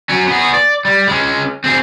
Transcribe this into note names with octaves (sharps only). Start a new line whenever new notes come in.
F#3 C#4
B3 G#4
D5
G3
G#3 C#4
C4 G#4